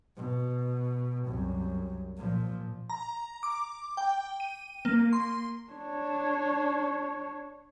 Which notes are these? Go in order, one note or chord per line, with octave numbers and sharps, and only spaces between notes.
B2
C2 F#2
A#2 F3
A#5
D6
G5
D#7
A#3
C6
D4 C#5